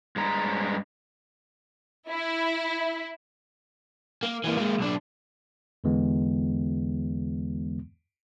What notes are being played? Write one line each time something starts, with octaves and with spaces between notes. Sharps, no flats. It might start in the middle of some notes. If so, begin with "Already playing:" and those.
G2 G#3 A#5
E4
A#3
E3 A#3
G#3 A#3
B1 D4
E2 D3 E3 G#3 B3